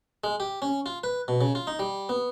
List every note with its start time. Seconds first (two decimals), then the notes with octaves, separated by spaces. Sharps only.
0.24 G#3
0.40 G4
0.62 C#4
0.86 F4
1.04 B4
1.28 B2
1.41 C#3
1.55 F4
1.67 D#4
1.79 G3
2.09 B3